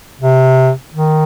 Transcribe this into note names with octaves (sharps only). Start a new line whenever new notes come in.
C3
D#3